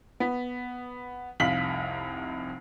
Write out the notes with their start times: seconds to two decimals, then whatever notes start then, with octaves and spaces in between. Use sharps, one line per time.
0.20 B3
1.40 F1 C2 F5 B6 F#7